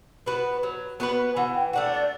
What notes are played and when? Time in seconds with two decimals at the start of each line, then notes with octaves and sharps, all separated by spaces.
0.26 B3 F#4 B4
0.63 F#3
1.00 B3 F#4 B4
1.36 E3 F#5
1.56 G5
1.73 A3 D4 F#4 F#5
1.91 D5